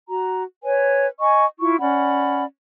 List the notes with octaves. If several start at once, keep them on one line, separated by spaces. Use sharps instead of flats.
F#4 A#5
B4 C#5 G#5
D#5 G#5 C#6
E4 F4 C#6
C#4 D5 F#5 B5